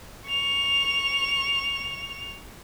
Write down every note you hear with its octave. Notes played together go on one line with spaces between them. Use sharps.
C#6 F7